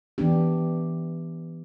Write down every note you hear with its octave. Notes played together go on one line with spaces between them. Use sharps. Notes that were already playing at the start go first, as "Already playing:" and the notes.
E3 B3 D4 G4